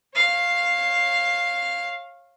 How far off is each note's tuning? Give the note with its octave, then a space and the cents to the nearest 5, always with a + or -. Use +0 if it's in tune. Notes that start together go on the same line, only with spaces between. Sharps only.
C#5 -30 F5 +0